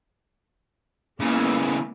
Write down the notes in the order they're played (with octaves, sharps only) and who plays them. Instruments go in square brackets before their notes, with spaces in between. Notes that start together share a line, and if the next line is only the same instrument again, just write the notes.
[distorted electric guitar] C#3 E3 [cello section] G#3 A#3 B3